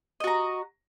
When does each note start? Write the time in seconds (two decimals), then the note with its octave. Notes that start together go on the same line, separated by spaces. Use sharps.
0.20 D#5
0.24 F#4
0.27 A#5